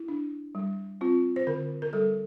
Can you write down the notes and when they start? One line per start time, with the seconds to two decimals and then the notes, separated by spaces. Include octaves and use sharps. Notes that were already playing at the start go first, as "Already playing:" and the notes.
Already playing: E4
0.08 D4
0.55 G3
1.01 C4 F4
1.36 C5
1.47 D3 A#4
1.82 A#4
1.93 G3 A4